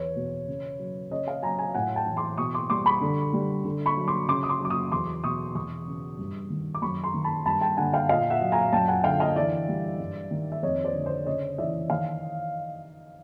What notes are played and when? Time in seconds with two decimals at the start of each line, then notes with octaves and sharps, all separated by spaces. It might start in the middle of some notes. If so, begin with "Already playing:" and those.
Already playing: E2 B4 C#5
0.16 B2
0.48 C#3
0.79 F#3
1.11 C#3 C#5 D#5
1.27 D#5 F5
1.42 F#3 G#5 A#5
1.59 G#5 A#5
1.74 A2 F#5 G#5
1.96 G5 A5
2.06 E3
2.17 C6 D6
2.38 B2 C#6 D#6
2.54 C6 D6
2.70 G3 C6 D6
2.86 B5 C#6
3.01 D3
3.33 G3
3.64 D3
3.86 B5 C#6
3.97 F#3
4.08 C6 D6
4.28 C#3 C6 D6
4.43 D#6
4.49 C6 D6
4.60 F#3 D6
4.70 C#6 D#6
4.92 E2 C6 D6
5.24 B2 C#6 D#6
5.55 E2 C#6 D#6
5.87 C#3
6.19 G2
6.50 D#3
6.75 D6
6.82 F#2 B5 C#6
7.04 A#5 C6
7.14 D#3
7.24 A5 B5
7.46 G2 A5 B5
7.61 G5 A5
7.77 D3 F#5 G#5
7.93 F5 G5
8.09 A#2 D#5 F5
8.30 E5 F#5
8.41 F#3
8.52 G#5 A#5
8.72 F#2 G5 A5
8.88 F#5 G#5
9.04 D3 F5 G5
9.20 D#5 F5
9.36 E3 D5 E5
9.68 G3
10.00 G2
10.31 D#3
10.52 E5
10.63 F2 C#5 D#5
10.84 C5 D5
10.94 D3
11.05 C5 D5
11.26 C#3 C#5 D#5
11.58 E3 D5 E5
11.90 D#3 D#5 F5